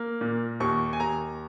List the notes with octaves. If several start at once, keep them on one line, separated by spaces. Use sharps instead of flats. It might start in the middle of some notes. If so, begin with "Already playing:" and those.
Already playing: A#3
A#2
D#2 C#6
G#5
D#2 A#5